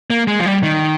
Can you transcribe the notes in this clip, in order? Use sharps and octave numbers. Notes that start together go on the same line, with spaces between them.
A#3
G#3
F3
G3
D#3